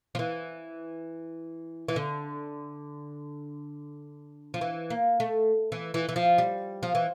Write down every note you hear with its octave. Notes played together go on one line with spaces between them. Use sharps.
F3
E3
E3
D3
F3
E3
A#3
A3
E3
E3
E3
F3
G3
F3
E3